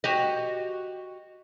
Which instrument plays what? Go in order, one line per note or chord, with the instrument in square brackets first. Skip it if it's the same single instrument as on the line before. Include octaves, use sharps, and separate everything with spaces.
[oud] F#4 G4 D#5